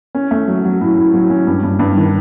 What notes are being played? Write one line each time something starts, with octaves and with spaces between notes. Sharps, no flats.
C#4
A3
F#3
F#3
A2
A2
F#3
C#4
G2
G2
G2
D#3